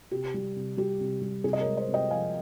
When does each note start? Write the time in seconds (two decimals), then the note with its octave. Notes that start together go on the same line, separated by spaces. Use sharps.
0.11 C3 G4
0.34 G3
0.56 C3
0.77 G3 G4
1.01 C3
1.21 G3
1.44 C3 G#4
1.53 D#5
1.60 A#4 C#5
1.66 G#3
1.77 C5 D#5
1.88 C3
1.94 D#5 G5
2.10 F3 F5 G#5